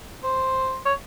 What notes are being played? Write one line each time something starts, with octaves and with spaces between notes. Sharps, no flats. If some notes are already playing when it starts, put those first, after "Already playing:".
C5
C#5